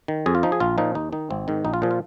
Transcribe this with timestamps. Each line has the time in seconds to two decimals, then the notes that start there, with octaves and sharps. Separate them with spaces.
0.08 D#3
0.26 F2 G#4
0.35 F4
0.43 F3 D#4
0.52 G#4
0.60 A#1 F4
0.78 A#2 F3 D#4
0.95 D#2 D#4
1.13 D#3 D#4
1.30 G#1 C4
1.48 G#2 D#3
1.65 A#1 D#4
1.74 F4
1.82 A#2 F3 G#4
1.91 F4